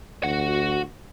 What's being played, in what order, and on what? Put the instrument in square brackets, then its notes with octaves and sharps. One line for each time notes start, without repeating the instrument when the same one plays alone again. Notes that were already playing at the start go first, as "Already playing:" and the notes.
[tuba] D2 [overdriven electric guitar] F#4 F#5